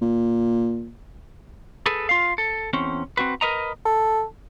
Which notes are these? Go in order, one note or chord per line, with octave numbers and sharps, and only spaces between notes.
A#2
G#4 A4 B4
F4 F5
A4
E2 C4 C#4
C4 F#4 B4
A#4 B4 D#5 A#5
A4